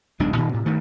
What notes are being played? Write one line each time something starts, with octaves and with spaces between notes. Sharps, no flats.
D1 B1 G#3 D4
G2 A#2 D#3
A2 C3
G2 D#3 A3